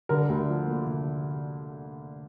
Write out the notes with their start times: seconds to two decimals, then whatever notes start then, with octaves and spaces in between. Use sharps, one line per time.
0.09 D3 A#4
0.29 D2
0.49 F3
0.68 A#3
0.87 D3